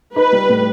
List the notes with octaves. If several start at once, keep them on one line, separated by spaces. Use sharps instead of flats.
D#4 B4
G3
A2